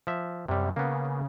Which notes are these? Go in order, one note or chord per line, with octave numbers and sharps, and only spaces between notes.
F3 E5
F#2 C3 G3
C#3 A#3 B3